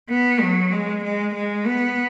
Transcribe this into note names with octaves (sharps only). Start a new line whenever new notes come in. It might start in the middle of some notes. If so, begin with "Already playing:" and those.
B3
F#3
G#3
G#3
G#3
B3